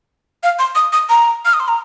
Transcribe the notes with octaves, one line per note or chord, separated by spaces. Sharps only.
F5
C6
D#6
D#6
A#5
F6
D#6
C6
A#5